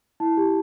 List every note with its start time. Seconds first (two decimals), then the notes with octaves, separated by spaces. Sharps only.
0.20 E4 A5
0.37 G4